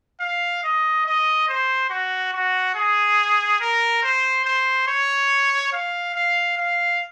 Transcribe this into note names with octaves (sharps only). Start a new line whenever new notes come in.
F5
D#5
D#5
C5
F#4
F#4
G#4
A#4
C5
C5
C#5
F5
F5
F5